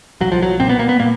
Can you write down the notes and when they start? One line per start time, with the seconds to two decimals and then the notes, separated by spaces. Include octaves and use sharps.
0.21 B1 F#3
0.32 F3
0.42 F#3
0.60 A#2 C4
0.69 B3
0.79 A#3
0.89 B3
1.00 A#2 A#3